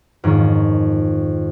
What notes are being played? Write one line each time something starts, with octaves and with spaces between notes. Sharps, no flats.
F2 G#2 D#3 C#5